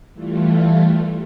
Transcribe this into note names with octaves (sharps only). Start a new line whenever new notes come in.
E3 G3 A3 F4